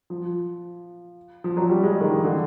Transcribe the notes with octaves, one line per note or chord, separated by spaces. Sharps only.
F3
F3
F#3
G3
G#3
D#3
E3
D3